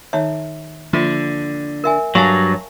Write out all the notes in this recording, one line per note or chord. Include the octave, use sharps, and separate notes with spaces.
D#3 D#4 C#5 E5
D3 F3 A#3 F4
A#4 E5 G#5
G2 F#3 F5 G#5 A5